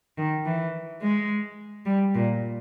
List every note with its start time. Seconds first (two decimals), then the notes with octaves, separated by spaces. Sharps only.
0.18 D#3
0.45 E3
1.02 G#3
1.86 G3
2.14 A#2